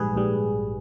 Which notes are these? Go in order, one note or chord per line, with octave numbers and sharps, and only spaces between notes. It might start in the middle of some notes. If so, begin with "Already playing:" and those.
Already playing: A#1 G#2 G3 G#4 B4
A#1 G#2 G3